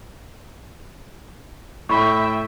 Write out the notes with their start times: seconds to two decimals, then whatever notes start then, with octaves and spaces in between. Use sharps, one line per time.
1.89 A2 E5 G5 B5 C#6